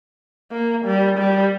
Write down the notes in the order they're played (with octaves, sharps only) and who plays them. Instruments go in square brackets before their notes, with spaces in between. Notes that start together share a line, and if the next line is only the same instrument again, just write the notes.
[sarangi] A#3
G3
G3